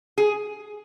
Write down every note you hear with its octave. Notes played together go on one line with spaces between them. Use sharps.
G#4